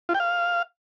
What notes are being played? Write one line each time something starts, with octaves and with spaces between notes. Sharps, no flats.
F4
G5
F5